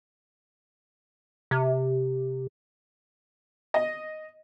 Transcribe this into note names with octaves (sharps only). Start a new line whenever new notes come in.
C3
D#5